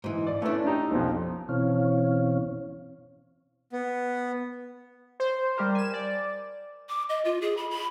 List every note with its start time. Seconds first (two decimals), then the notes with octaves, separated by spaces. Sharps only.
0.04 G#2 E3
0.27 D5
0.42 A3 C#4 D4 E4 A4 B4
0.67 D#4 G4
0.91 B1 F2 F3
1.49 B2 E3 C4 C#4 C#5 F5
3.73 B3
5.20 C5
5.56 G3 G4 A#4 C5
5.75 G#5 E7
5.93 D5
6.89 D6
7.09 D#5
7.25 F4
7.41 G#4
7.57 B5
7.70 B5